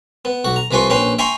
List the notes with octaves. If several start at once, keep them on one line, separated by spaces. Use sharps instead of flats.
B3
B1 F#4 F#5
A#5
C2 F3 B4 G#5 C6 C#6
A#1 C#4 B4 G5 C6
E5 G5 G#5 A#5 C6 C#6